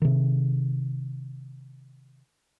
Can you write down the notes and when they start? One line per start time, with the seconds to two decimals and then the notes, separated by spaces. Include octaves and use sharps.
0.02 C3 D#3